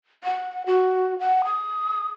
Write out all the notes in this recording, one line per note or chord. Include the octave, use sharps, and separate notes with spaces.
F#5
F#4
F#5
D#6